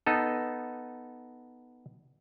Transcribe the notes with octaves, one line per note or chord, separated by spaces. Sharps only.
B3 D#4 A4